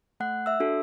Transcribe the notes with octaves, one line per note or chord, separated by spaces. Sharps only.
A3 F#5 F#6
E5 E6
D4 F#4 A4